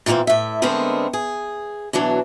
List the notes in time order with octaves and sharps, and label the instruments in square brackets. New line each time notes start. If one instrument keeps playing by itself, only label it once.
[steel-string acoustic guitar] A#2 E3 G3 A#3 C4
A2 E5
D3 G#3 A3 B3 C4 A#4
G#4
B2 E3 F#3 D4